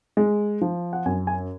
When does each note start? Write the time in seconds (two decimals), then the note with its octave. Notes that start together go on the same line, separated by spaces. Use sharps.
0.17 G#3
0.61 F3
0.93 F#5
1.05 F#2 G#5
1.27 G#5